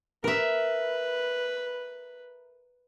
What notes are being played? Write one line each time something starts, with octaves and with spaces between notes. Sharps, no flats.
A#4 B4 E5